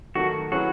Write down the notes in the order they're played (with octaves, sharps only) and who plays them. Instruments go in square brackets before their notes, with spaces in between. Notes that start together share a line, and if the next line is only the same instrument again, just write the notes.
[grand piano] D#3 F#3 A3 [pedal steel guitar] F#4
[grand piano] F#3 C#4 E4 G#4 B4 [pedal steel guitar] F#4